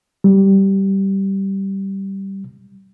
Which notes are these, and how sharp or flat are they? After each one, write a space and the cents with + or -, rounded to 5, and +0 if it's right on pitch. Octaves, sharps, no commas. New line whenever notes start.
G3 -10